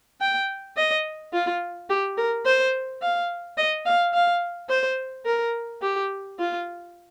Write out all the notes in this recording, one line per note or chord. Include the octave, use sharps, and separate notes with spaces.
G5
D#5
F4
G4
A#4
C5
F5
D#5
F5
F5
C5
A#4
G4
F4